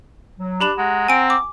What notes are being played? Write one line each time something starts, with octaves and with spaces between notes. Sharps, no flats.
F#3
D4 G4 B5 E7
G#3 F#5 A#5
C4 G#5 D7
D6